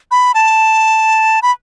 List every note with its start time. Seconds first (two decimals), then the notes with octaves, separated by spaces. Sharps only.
0.11 B5
0.34 A5
1.42 B5